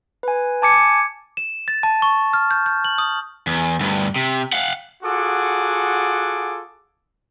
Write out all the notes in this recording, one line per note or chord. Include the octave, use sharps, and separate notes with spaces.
B4 G#5
G#5 A5 D6 G#6 C#7
E7
A6
A5
C#6
F6
G6
G6
F#7
D#6
E2
D2 G2
C3
F5 F#5
F4 F#4 G#4 A4 F#5 D6